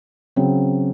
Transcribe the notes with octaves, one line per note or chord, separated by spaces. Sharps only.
C#3 F#3 C4